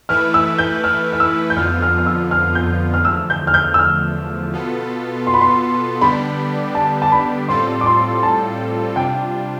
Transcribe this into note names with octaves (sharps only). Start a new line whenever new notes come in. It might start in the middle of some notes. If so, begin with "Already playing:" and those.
E3 A3 E4 B4 F6
E6
G6
F6
F6
E6
G6
F2 D3 F3 B3 F4 F6
F6
F6
E6
F6
G6
F6
E2 D3 F3 A3 E6
G6
F6
G6
E6
F6
B2 B3 F4 A4
C6
B5
C6
D3 G3 B3 D4 G4 B5
A5
A5
B5
A2 G3 C4 F4 A4 C6
D6
C6
A5
C3 G3 D4 F4 G5